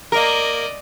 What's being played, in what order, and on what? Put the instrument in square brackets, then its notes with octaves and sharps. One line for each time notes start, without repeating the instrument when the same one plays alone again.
[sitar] A#3 A#4 [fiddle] D5 D#5